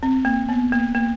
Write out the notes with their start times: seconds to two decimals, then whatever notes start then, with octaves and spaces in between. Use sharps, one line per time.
0.03 C4
0.25 A#3
0.49 B3
0.72 A#3
0.95 A#3